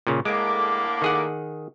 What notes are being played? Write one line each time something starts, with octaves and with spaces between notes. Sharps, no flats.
A#2 C#3
A2 D3 G#3 A#3 D6
D#3 G#4 F#5